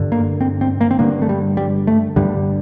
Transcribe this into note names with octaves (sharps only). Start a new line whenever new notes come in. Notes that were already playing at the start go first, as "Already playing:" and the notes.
Already playing: G2 D3
A#3
C4
C4
A#3
C4
G2 D3 A#3
A3
G3
G3
A3
G2 D3 G3